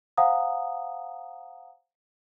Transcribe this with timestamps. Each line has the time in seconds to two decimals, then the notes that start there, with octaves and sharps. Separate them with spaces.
0.17 C5 F5 F#5 G#5 A#5 D#6